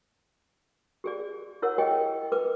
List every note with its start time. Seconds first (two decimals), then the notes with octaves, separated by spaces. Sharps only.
1.04 G4 G#4 D5
1.62 E4 A#4 C#5 F#5 E6
1.78 G4 G#4 C#5 D#5 G5
2.32 A#4 B4 D6